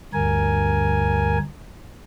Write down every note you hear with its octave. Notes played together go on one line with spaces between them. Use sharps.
D2 G2 A#4 G#5